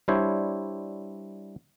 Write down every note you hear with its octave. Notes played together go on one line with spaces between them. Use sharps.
G3 D4 E4 C5 C#5